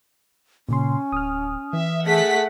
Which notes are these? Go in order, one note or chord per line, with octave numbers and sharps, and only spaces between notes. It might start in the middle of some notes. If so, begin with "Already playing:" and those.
A#2 C#3 C#4 C6
D1 D#6 F6
E3 E5
A3 G#4 F#5 B6